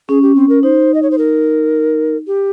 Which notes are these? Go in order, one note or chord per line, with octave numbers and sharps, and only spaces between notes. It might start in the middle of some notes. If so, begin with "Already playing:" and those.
C#4 G#4
G4
C4
A#4
D#4 C5
D#5
C#5
C5
A#4
G4